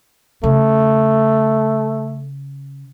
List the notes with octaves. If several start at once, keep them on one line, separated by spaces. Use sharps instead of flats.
C#3 A3